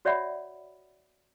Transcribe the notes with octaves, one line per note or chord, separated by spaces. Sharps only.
F#4 C#5 D5 E5 F#5 B5